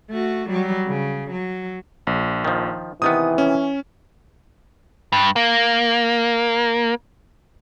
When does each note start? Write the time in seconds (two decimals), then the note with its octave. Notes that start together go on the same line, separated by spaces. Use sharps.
0.11 A3 F#4
0.49 F#3 G3
0.88 C#3
1.31 F#3
2.07 A#1
2.45 D#3 F3
3.02 C3 D#3 E3 B3 D#6
3.38 C#4
5.12 G2
5.36 A#3